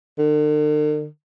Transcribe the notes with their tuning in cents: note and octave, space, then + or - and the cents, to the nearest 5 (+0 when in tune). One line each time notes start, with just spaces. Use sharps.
D3 +45